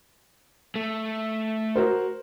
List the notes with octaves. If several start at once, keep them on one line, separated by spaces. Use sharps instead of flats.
A3
F#4 A#4 C5